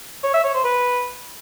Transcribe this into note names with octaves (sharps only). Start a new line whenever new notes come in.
C#5
E5
C#5
C5
B4